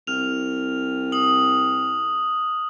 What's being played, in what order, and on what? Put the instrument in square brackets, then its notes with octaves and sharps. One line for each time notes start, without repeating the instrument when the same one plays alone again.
[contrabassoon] C2 [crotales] F6 F7
[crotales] D#6 F#7